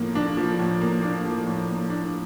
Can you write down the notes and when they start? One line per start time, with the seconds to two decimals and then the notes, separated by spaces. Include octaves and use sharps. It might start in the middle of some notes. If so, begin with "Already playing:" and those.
Already playing: A2 F3 A#3
0.15 D4
0.37 F3
0.59 A2
0.81 A#3
1.03 D4
1.25 F3
1.47 A2
1.69 A#3
1.90 D4